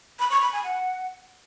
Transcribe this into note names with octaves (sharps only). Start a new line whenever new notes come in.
B5
C#6
B5
G#5
F#5